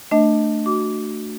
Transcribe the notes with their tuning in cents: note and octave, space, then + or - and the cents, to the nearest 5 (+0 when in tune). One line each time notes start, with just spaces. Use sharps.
A3 +10 D4 +20 D#5 +20
F#4 +0 D6 -20